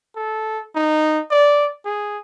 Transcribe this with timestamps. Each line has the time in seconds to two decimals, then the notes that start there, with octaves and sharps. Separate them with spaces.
0.16 A4
0.75 D#4
1.31 D5
1.85 G#4